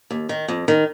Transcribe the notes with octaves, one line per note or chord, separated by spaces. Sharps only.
D#2
D#3
F2
D#3